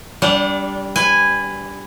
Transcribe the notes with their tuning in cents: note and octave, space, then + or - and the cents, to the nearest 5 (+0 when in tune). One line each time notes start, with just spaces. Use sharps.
G3 +0 D4 -30 F#5 -35
B4 +15 G#5 -10